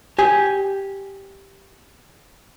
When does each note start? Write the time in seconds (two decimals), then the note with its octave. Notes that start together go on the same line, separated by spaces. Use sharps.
0.19 G4 G#5